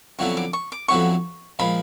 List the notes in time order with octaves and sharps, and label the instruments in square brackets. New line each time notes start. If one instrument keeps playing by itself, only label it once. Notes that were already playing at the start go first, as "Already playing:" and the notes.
[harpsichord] F2 D3 F#3 B3 E4 [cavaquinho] C#6
[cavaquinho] D6
C#6
D6
[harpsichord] F2 D3 F#3 B3 E4 [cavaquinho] C#6
[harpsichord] A#2 F3 G#3 [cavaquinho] B5